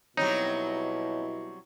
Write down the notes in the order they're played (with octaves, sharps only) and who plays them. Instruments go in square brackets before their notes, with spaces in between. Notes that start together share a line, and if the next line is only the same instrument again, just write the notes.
[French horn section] B2 E4 [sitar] F#3 G3 C4 [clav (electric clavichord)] D#4 [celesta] C#5